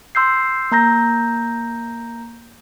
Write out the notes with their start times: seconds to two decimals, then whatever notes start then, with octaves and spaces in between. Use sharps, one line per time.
0.15 C6 E6 G6 C7
0.72 A#3 A#5 G6 A#6